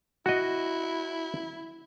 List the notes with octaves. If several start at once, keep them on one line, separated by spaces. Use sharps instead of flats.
E4 F#4 D#5